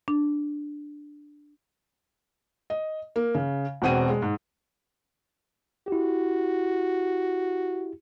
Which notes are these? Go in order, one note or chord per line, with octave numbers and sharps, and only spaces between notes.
D4
D#5
A#3
C#3
E1 B2 C4 F#5 D#7
G#3
G#2
E4 F#4 G4